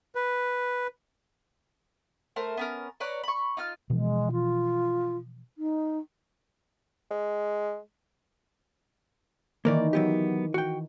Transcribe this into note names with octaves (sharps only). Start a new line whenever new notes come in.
B4
A3 A#4 C5
B3 C#4 A#4
B4 C#5 D5 A#5
B5 C#6
D#4 F4 F6
B2 E3 F3 G#3
F4
D#4
G#3
D#3 E3 A#3 A#4 D5
F#3 B3 G4
F#4 G5